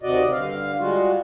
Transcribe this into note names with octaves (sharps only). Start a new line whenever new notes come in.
D#2 C3 F#4 D5 D#5
G2 D3 F5
G3 G#3 F4 F#4